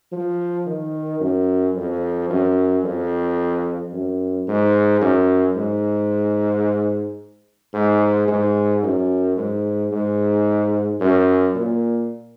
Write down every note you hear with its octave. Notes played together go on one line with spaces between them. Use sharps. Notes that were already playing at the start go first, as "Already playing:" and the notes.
F3
D#3
F#2
F2
F#2
F2
F#2
G#2
F#2
G#2
G#2
G#2
F#2
G#2
G#2
F#2
A#2